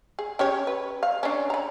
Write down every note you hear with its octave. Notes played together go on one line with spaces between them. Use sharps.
G#4
C#4 G4 C#5
B4
F5
C#4 D4
A#5 B5